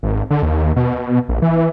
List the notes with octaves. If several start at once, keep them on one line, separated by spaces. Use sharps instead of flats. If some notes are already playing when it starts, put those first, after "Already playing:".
G#1
D3
D#2
B2
A#1
E3